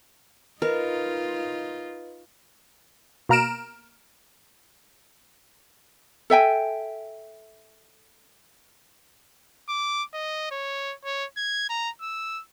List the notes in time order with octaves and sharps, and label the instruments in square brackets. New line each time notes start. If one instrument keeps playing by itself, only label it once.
[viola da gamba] D#4 F4 [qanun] A#4 [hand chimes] B4 D#5
[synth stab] B2 A#3 A#5 F6 D7 E7
[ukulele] A4 E5 G5 G#5
[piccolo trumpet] D6
D#5
C#5
C#5
G#6
A#5
E6